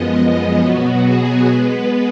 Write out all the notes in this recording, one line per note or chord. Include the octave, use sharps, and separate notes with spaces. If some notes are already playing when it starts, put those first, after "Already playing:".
Already playing: F#2 F3 G#3 B3 D#5
B2 F#3 B3 F#4
G#4
G#3 B3 B4